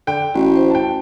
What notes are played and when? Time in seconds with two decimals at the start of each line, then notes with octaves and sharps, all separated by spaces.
0.07 D3 G5
0.34 A1 F#4
0.56 C5
0.71 G5 A5